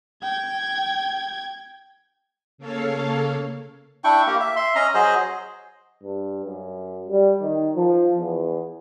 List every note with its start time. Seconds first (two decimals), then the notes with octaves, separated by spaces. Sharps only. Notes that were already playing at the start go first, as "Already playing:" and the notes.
0.22 G5 G#6
2.58 C#3 A#3 A4 C#5 F5
4.04 D4 E4 G5 C#6
4.27 A#3 G4
4.40 E5
4.56 E5 C6
4.75 C#4 D#5 A#5
4.94 F#3 G#4 C5 D#5
6.03 G2
6.44 F#2
7.08 G3
7.42 D#3
7.76 F3
8.20 E2